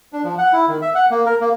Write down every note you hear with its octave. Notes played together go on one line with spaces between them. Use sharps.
D4
F3
F#5
E4
D#3
E5
F#5
A#3
A#4
A#3